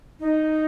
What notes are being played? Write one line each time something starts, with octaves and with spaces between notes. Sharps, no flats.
D#4